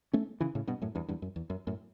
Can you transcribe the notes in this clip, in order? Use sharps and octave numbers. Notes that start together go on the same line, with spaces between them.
A3 C#4
C#3 E3
A2 C#3
G2 B2
F#2 A2
E2 G2
E2 G2
F#2
E2
F#2
F#2 A2